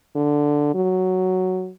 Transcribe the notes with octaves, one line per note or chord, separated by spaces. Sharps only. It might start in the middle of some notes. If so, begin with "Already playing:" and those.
D3
F#3